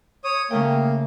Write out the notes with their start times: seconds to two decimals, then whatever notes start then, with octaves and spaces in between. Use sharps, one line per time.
0.24 C#5 D#6
0.51 C#3 A3 A#3 G5